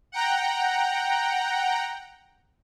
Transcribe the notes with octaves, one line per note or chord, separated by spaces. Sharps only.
F#5 G5 A#5